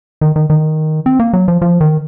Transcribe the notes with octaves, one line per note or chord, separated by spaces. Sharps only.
D#3
D#3
D#3
C4
A#3
F#3
F3
F3
D#3